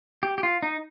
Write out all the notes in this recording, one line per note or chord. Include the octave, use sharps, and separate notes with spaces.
G4
G4
F4
D#4